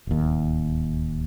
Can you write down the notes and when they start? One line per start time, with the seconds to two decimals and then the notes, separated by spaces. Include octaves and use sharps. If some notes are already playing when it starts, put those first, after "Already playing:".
0.07 D1 D#2